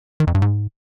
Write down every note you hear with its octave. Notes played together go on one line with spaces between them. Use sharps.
D#3
F2
G2
G#2